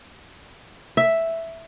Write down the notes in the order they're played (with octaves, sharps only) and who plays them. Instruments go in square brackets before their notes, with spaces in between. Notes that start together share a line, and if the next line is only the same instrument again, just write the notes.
[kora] E5